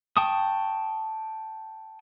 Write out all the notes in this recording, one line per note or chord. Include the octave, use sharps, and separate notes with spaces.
G5 A5 C#6 D#6